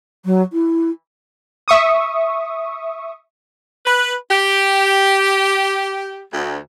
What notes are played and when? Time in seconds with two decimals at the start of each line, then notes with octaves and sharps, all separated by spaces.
0.25 F#3
0.52 E4
1.68 E5 C#6 D#6
3.86 B4
4.30 G4
6.32 D2